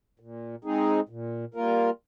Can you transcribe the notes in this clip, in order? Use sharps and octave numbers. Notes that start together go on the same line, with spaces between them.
A#2
G#3 C4 D#4 G#4
A#2
G3 A#3 F4 A#4